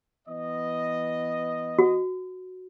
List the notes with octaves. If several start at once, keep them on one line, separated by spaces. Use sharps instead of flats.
E3 B3 D#5
F#4